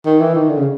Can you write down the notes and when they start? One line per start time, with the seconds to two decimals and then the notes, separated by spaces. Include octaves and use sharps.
0.05 D#3
0.20 E3
0.35 D#3
0.49 D3
0.57 C#3